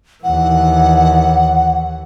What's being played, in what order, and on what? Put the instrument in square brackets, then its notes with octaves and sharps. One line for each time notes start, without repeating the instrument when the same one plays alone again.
[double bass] D#2 E3 [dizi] F#5